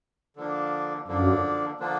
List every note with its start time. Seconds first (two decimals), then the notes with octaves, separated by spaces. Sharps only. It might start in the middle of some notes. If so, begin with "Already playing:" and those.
0.36 D3 F3 A#3 D4
1.08 F#2 D3 F3 A#3 D4
1.80 D3 F3 A#3 D4